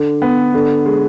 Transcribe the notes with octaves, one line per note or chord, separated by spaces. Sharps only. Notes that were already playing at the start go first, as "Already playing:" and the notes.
Already playing: D3
B3
D3
G#3